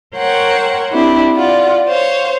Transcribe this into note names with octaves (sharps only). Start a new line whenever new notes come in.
A#4 C5 C#5 F#5 G5
C4 D4 E4 G4
F4 D5 F#5
C5 C#5 F5